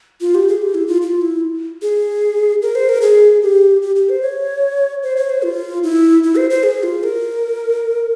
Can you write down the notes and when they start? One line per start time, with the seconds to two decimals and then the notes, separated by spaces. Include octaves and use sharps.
0.21 F4
0.35 G4
0.48 G#4
0.62 G4
0.74 E4
0.88 F4
1.02 F4
1.22 E4
1.82 G#4
2.62 A#4
2.75 C5
2.89 A#4
3.02 G#4
3.43 G4
3.82 G4
3.96 G4
4.09 C5
4.22 C#5
5.03 C5
5.17 C#5
5.30 C5
5.43 F4
5.83 E4
6.23 E4
6.36 C5
6.50 C5
6.63 G#4
6.83 F4
7.03 A#4